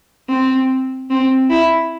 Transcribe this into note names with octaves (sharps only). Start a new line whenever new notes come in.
C4
C4
E4